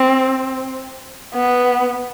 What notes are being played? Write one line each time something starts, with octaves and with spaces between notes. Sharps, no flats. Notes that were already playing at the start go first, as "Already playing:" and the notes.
Already playing: C4
B3